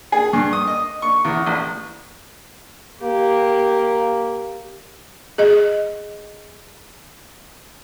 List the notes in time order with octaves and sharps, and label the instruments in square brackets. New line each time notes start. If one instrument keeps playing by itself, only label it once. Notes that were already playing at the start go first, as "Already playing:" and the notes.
[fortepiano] G#4
G2
D#6
D#5
C#6
E2
A1
[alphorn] A#3 [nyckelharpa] G4
[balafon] G#4 D#5